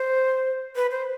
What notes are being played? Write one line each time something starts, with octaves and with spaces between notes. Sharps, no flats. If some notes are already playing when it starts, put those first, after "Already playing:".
Already playing: C5
B4
C5